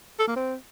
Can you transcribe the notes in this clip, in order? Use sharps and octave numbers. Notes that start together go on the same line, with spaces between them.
A4
A#3
C4